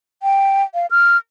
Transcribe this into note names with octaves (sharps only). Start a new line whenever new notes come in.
G5
F5
F6